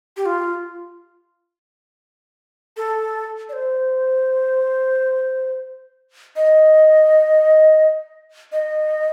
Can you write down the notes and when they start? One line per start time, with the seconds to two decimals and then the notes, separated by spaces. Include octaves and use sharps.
0.17 G4
0.25 F4
2.77 A4
3.49 D5
3.53 C5
6.36 D#5
8.52 D#5